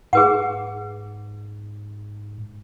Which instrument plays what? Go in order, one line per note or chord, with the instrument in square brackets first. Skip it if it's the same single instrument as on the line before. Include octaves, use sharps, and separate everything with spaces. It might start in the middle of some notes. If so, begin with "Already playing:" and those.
[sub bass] G#2 [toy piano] G#4 B4 F#5